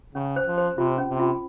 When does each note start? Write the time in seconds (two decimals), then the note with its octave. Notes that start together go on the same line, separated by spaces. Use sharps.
0.15 C#3 C#4
0.36 C5
0.47 F3
0.58 C5
0.77 C3 F4
0.98 C#4
1.09 C3
1.19 F4